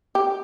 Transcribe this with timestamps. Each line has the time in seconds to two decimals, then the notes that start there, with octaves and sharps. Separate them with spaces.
0.15 G4